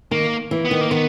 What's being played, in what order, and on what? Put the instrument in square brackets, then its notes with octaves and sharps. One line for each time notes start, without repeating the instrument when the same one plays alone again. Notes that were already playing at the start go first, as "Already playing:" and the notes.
[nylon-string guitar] D#3 [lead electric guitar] A#3
[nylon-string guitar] E3
[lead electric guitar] B3
[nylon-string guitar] D#3
[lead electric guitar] A#3
[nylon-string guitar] D#3 [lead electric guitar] B3